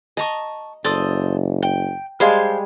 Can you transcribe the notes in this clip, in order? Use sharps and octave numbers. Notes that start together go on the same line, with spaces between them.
D#5 A5 A#5 C#6
F#1 A4 C5 D5 D#6
G5
G3 G#3 G#4 C5 F5 A5